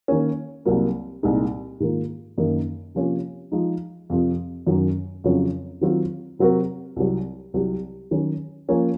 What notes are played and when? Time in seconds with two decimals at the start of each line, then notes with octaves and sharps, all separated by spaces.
0.08 D#3 A#3 C#4
0.65 C2 C3 F#3 A#3
1.23 C2 A#2 G#3 D#4 G#4
1.80 G#2 D#3 A#3 F4
2.38 F#2 D#3 A#3 D#4
2.95 C3 F3 A#3 C#4 F4
3.52 F3 G#3 D#4
4.10 F2 C3 F3 C4
4.67 F#2 D#3 F#3
5.24 F2 C#3 F#3 C#4 F4
5.81 D#3 F#3 C4 F4
6.39 C3 F#3 C4 F#4 A#4
6.96 C2 C3 F#3
7.54 C2 C3 F#3
8.11 D#3 F#3 C#4
8.68 F3 A#3 C#4 F4